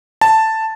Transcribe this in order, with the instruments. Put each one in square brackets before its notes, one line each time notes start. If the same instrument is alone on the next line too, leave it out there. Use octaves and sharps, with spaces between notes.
[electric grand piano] A5